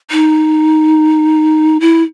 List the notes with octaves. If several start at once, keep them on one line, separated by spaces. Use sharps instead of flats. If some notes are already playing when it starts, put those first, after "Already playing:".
D#4
E4